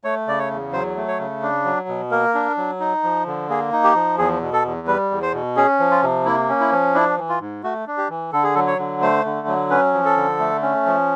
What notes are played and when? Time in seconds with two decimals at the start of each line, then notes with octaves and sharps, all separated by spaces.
0.04 A3 C#5
0.27 C#3 D5
0.39 C#5
0.50 E2
0.73 F#3 C5
0.97 A3
1.08 C#5
1.19 C#3
1.42 D4
1.65 F#3
1.88 B2
2.11 A#3 A#4
2.35 D4
2.57 F#3
2.80 D#4
3.03 F3
3.26 D3
3.49 A#3 G#4
3.72 D#4
3.84 G4
3.95 F3
4.18 E2 G#4
4.42 B2
4.53 A4
4.65 E2
4.87 G3 B4
5.10 E2
5.22 C5
5.33 B2
5.57 C#4 G#4
5.79 F3
5.91 F4
6.03 C3
6.25 A#3 E4
6.48 C#4
6.60 E4
6.72 F3
6.94 D4 E4
7.18 E3
7.29 F4
7.40 G#2
7.63 A3 F#4
7.87 D4
7.98 G4
8.09 E3
8.33 D3 A4
8.43 G#4
8.55 F#3 A4
8.67 C#5
8.79 D3
9.02 A3 C5
9.25 D3
9.47 F#3
9.70 C#4 B4
9.94 F3
10.05 A4
10.17 D3
10.40 A3
10.62 C#4
10.86 F3